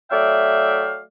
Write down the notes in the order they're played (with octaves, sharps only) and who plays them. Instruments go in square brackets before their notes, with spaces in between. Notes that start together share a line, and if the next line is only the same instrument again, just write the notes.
[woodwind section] F#3 A3 D5 E5 F5 G5